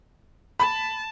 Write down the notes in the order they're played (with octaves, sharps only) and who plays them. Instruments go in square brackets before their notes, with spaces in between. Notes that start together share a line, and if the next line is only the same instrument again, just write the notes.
[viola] A5 [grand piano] B5